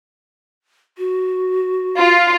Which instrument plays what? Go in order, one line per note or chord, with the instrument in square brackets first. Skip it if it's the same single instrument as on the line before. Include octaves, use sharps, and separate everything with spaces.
[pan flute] F#4
[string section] F4